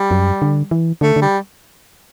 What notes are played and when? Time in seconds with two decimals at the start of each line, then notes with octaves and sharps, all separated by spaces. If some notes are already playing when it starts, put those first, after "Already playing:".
Already playing: G3
0.11 F#2
0.42 D3
0.71 E3
1.01 D3 A3
1.16 D3
1.22 G3